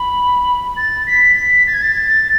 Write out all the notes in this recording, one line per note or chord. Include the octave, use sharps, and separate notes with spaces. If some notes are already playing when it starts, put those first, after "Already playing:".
Already playing: B5
A6
B6
B6
A6
G#6
A6